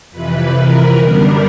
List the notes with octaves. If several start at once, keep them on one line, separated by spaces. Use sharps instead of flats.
F2 C3 E3 B4
A#4
F#2 D3 G3 B3 D4 A#4